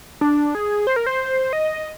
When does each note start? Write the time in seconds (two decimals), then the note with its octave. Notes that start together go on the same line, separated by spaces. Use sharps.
0.21 D4
0.55 G#4
0.87 C5
0.96 A#4
1.06 C5
1.53 D#5